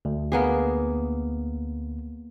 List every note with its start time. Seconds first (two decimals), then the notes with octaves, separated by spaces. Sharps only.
0.05 D2
0.32 A#3 B3 G#4